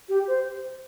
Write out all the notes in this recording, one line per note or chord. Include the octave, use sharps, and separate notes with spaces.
G4
C5